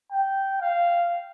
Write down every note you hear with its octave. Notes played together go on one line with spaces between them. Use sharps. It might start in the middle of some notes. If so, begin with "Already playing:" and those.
G5
F5